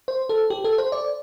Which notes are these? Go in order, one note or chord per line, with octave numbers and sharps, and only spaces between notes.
C5
A4
G4
A4
C5
D5